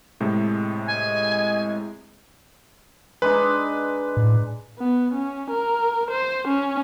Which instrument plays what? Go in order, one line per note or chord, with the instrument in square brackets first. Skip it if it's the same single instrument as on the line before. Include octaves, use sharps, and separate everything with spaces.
[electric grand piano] A2 C3 G#3
[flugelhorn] D#5 [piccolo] G#5
[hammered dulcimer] G#3 D4 D#4 [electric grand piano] B4
[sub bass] A2
[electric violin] B3
C#4
A#4
C5
C#4